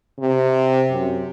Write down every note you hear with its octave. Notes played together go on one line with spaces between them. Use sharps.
C3
F#2